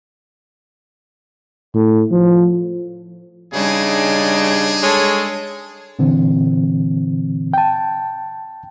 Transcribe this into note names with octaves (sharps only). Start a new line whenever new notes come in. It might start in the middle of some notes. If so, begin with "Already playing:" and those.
A2
F3
C#3 G3 D4 D#4 G#4
G#3 A4 C#5
A#2 D3 E3 C4
G5 A5